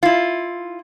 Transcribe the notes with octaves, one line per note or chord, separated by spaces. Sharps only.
E4 F4